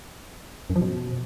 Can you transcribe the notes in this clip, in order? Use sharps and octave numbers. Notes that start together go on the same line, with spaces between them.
F#2
F3
B2